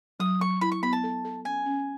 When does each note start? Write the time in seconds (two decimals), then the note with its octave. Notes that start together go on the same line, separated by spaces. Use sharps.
0.20 F#3 D#6
0.40 F#3 C#6
0.61 E4 B5
0.72 C#6
0.83 B3 B5
0.93 A5
1.04 A4
1.25 A4
1.45 C#4 G#5
1.66 C#4